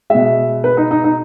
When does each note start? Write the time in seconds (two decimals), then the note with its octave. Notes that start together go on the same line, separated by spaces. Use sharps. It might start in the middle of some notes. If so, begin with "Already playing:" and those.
0.10 B2 G#3 E5
0.64 B4
0.77 D#4
0.91 D#4
1.04 D#4